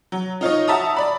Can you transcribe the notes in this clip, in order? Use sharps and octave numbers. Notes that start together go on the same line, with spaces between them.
F#3
D#4 F4 C#5 D#5
F#4 E5 A5 A#5 D#6
D5 B5